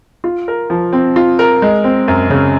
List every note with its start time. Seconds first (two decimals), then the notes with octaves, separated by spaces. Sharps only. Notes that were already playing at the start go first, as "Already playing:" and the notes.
0.24 F4
0.48 A#4
0.70 F3
0.93 C4
1.16 F4
1.39 A#4
1.62 G#3
1.84 C4
2.08 F#2
2.30 C#3